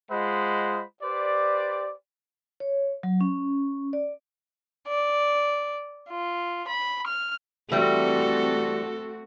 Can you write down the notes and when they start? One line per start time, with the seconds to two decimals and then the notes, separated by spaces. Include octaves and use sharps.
0.11 G#3 F4 C5 D#5 F#5 B5
1.03 G4 B4 C5 D5
2.60 C#5
3.03 F#3
3.21 C#4
3.93 D5
4.86 D5
6.11 F4
6.67 B5
7.06 F6
7.72 E3 G3 A3 C4 F#4 A4